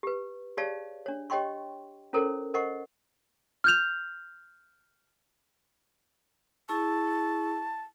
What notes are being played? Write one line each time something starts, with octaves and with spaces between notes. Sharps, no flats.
G4 B4
G4 G#4 C#5 D5 F5 A5
D4 C#5
G4 C#5 D#5 G5 C6 C#6
C#4 E4 A4 A#4 C5 C#5
A#4 C5 D#5 F#5 C#6
F6 G6 F7
E4 G#4 A5 C#6